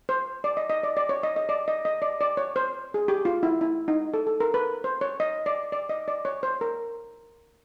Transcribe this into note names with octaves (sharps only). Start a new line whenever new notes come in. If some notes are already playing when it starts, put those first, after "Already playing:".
C5
D5
D#5
D#5
D5
D5
C#5
D#5
D#5
D5
D#5
D#5
D5
D5
C#5
C5
G#4
G4
F4
E4
E4
D#4
A4
A4
A#4
B4
C5
C#5
D#5
D5
D5
D#5
D5
C#5
C5
A#4